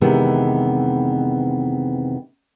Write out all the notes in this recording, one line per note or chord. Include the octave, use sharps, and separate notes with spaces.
F2 C3 D#3 E3 G#3 B3